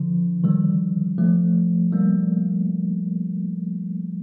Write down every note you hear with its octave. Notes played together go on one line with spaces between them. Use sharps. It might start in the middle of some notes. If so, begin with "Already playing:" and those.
Already playing: D3 F3
D#3 G3
F3 A3
G3 A#3